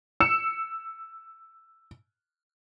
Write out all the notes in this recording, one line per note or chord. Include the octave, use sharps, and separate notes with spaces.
E6 C#7 E7